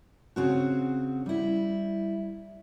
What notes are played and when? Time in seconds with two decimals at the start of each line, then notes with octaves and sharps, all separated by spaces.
0.36 C#3 C4 F#4
1.26 G3 E4